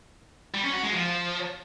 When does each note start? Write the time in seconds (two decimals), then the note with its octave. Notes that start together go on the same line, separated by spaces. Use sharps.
0.54 G3
0.64 C#4
0.73 F#4
0.83 G#3
0.92 F3